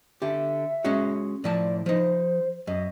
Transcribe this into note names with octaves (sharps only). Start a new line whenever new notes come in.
D3 G4 E5
G#3 C#4 F#4
A2 F3 D5 A5
F3 D#4 C5
F#2 D#5